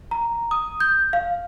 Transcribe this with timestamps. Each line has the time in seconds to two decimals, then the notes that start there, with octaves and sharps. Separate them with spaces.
0.11 A#5
0.51 D#6
0.80 G6
1.13 F5